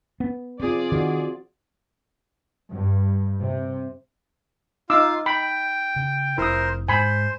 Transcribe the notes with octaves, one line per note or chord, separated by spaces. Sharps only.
B3
C4 F4 G#4 D5
D#3 F#4
G2
C3
D#4 F4 F5 D6 E6
G5 B5
C#3
F1 E4 A#4 C5 D#6
G#2 G#3 C5 G#5 B5